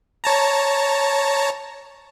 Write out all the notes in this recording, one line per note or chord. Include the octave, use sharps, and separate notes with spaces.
C#5 A5 A#5